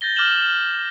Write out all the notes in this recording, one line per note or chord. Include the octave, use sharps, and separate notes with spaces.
G6 A6 A#6 G7
D6 F6 G6 E7 F#7 G7